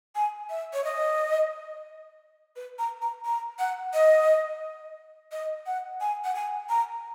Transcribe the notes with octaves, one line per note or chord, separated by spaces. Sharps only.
G#5
E5
C#5
D#5
B4
A#5
A#5
A#5
F#5
D#5
D#5
F#5
G#5
F#5
G#5
A#5